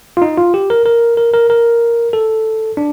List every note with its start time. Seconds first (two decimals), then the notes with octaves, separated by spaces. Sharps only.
0.17 F4
0.22 D#4
0.38 F4
0.54 G4
0.70 A#4
0.86 A#4
1.17 A#4
1.34 A#4
1.50 A#4
2.13 A4
2.77 D4